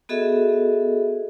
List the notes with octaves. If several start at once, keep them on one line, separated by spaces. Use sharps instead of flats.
B3 F#4 G#4 A4 D#5 E5